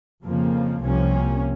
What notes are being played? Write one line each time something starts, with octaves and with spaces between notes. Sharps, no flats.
F2 C#3 F3 A#3
C2 C3 F3 A#3 C#4